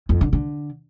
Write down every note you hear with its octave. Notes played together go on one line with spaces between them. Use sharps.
F2
D3
D3